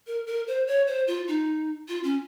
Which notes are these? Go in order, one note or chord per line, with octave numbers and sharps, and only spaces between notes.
A#4
A#4
C5
C#5
C5
F4
D#4
F4
C#4